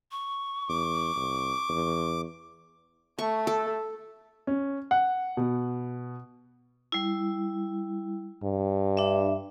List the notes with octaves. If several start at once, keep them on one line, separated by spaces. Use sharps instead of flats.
C#6
E2 D6
C2
E2
A3 C#6
A4
C#4
F#5
B2
G3 E4
G2
D4 E5